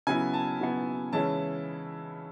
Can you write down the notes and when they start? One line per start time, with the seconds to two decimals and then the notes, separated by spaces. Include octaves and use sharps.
0.07 C#3 F#3 B3 E4 G#5
0.33 A5
0.60 C#3 F#3 B3 E4
1.13 C#3 E3 G#3 C#4 E4 A5